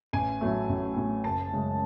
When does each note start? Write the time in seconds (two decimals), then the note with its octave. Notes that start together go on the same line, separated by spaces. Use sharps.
0.13 A1 G#5
0.41 A2 F#3 A3
0.69 A1
0.96 A2 F#3 A3
1.24 F#1 A5
1.53 F#2 C#3 G#3